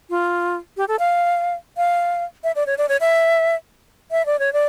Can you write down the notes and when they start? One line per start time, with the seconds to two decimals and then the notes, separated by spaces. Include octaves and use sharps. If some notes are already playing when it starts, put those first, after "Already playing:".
0.10 F4
0.77 G4
0.88 A4
0.99 F5
1.77 F5
2.44 E5
2.56 D5
2.67 C#5
2.78 D5
2.89 C#5
3.01 E5
4.11 E5
4.26 D5
4.39 C#5
4.53 D5